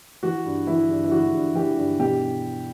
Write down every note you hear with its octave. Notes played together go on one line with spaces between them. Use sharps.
E3 F#4
G2
E3 E4
G2
E4
E3 F#4
G2
E3 G4
G2
B2 G4